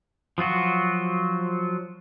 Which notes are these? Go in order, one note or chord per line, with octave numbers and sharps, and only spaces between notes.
F3 F#3 F4 F#4